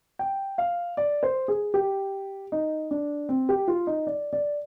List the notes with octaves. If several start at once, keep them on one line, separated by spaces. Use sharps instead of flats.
G5
F5
D5
C5
G#4
G4
D#4
D4
C4
G4
F4
D#4
D5
D5